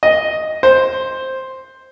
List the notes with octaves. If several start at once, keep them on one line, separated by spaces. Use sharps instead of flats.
D#5
C5